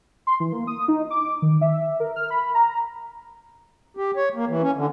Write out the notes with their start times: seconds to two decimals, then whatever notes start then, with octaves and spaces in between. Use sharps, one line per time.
0.27 C6
0.40 E3
0.52 A#3
0.67 D#6
0.88 D#4
1.11 D6
1.42 D#3
1.61 E5
2.00 A#4
2.16 F6
2.30 B5
2.55 A#5
3.97 G4
4.17 C#5
4.35 A#3
4.49 E3
4.62 C#4
4.76 D3